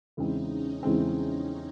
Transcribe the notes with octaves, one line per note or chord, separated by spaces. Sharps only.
E2 C#3 E3 G#3 C4 D#4
C#4
E2 C#3 E3 G#3 C4